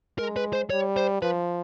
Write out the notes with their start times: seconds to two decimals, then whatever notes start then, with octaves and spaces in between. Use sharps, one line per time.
0.19 G#3 A#4
0.36 B4
0.53 C5
0.70 G3 C#5
0.97 C5
1.22 F3 B4